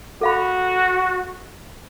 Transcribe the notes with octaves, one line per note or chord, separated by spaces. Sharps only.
F#4 A4 F5 B5